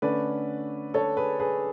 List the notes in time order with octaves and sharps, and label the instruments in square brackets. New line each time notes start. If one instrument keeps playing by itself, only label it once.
[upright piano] D3 A3 C#4 B4 D5
A4 C#5
G#4 B4
G#4 B4